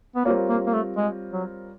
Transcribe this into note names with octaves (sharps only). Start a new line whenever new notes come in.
B3
G3 A#3 C4 F4 A#4 C#5
A#3
A#3
A3
G#3
F#3